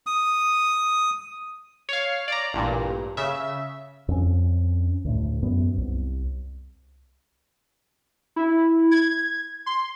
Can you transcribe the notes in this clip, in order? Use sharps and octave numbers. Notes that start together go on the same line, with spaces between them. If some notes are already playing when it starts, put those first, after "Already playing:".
D#6
C#5 F5
D5 A#5
A1 G2 A#2
C#3 E5
F2 C#4
D2 A2
F#2 B3
C2
E4
G#6
C6